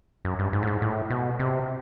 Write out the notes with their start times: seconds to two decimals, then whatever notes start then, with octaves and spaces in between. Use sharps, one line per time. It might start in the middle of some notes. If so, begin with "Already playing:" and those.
0.25 F#2
0.39 G2
0.53 G#2
0.63 A2
0.67 G#2
0.82 A2
1.10 B2
1.39 C3